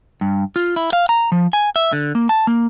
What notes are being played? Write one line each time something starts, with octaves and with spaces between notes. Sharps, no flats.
G2
F4
E4
F5
A#5
F3
G#5
E5
D3
A#3
A5
A#3